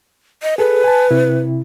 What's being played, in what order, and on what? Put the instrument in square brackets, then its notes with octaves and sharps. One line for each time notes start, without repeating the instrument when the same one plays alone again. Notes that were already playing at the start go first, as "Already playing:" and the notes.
[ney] D#5
[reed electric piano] G#4 A4 [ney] B4
[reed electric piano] G#5 A5
C3 E4